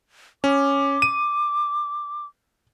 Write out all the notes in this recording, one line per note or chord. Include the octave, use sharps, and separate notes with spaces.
C#4 D6
D#7